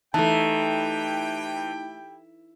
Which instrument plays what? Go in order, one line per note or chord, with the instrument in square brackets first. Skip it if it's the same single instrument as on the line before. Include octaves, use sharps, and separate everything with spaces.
[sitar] E3 [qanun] A3 D#4 [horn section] E4 G4 G5 [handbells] A5